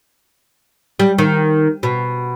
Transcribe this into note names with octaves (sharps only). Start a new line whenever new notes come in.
G3
D#3
B2